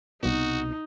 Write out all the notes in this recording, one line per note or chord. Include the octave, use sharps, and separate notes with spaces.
C2 B2 D#4 F#4